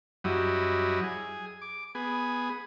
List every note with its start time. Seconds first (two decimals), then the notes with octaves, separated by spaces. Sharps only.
0.24 F#2 F#3 G3 E4 D#5
1.03 G#4
1.62 D6
1.95 B3 G#4